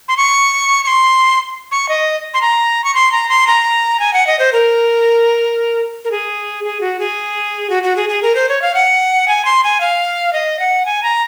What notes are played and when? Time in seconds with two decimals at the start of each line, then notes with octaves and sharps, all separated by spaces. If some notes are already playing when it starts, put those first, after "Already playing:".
0.08 C6
0.17 C#6
0.84 C#6
0.87 C6
1.71 C#6
1.89 D#5
2.34 C6
2.42 A#5
2.84 C#6
2.95 C6
3.12 A#5
3.29 C6
3.47 A#5
4.00 G#5
4.14 F#5
4.27 D#5
4.39 C5
4.53 A#4
6.05 A#4
6.11 G#4
6.64 G#4
6.81 F#4
6.99 G#4
7.70 F#4
7.83 F#4
7.96 G#4
8.09 G#4
8.22 A#4
8.35 C5
8.49 C#5
8.62 F5
8.75 F#5
9.28 G#5
9.45 C6
9.64 G#5
9.81 F5
10.33 D#5
10.60 F#5
10.86 G#5
11.03 A#5